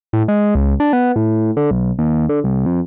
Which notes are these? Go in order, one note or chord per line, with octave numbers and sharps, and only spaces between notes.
A2
G#3
C#2
D4
B3
A2
D3
B1
D#2
D3
C2
F2